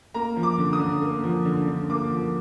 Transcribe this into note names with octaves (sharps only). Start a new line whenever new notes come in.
A#3 A#5
F3
D6
D3
D#6
D3
A#3
F3
D3
D3
A#3 D6
F3